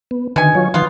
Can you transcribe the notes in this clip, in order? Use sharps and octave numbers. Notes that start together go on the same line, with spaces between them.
B3
B2 D3 D#3 G#5
F#3 F4 C#5
D#3 F3 B3 F4